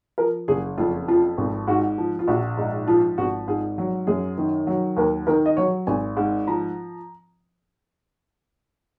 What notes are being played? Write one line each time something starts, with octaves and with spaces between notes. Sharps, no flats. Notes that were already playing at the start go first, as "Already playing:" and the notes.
F3 A#4
F#1 G#4
F2 F4
F3 F4
G#1
G#2 F#4
F3
F4
A#1 F#4
G#2 D#4
F3 F4
G#1 F#4
G#2 G#4
F#3
F#2 G#4
D#3
F#3
D#2 A#4
D#3 A#4
D#5
F#3 C#5
G#1 G#5
G#2
F3 A#5